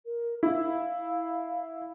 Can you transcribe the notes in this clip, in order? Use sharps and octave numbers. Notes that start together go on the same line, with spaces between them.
A#4
E4 F5